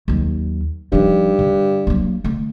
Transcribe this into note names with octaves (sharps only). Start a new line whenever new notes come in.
D#2 F#3
G2 F3 D#4
D3
F#3 A#3
D3 A3